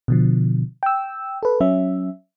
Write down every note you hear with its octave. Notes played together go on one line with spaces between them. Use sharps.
B2 D3 F3
G5 E6
A4 B4
F#3 C#4 E5